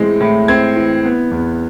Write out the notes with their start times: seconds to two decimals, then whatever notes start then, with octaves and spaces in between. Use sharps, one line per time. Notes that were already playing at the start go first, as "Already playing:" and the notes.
Already playing: A2 E3 G#3 C4 C6
0.21 A2
0.48 C4 G#6
0.76 E3
1.05 B3
1.31 E2